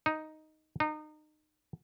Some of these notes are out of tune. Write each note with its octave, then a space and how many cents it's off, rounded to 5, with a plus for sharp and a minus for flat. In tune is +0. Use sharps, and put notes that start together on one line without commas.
D#4 +0
D#4 -30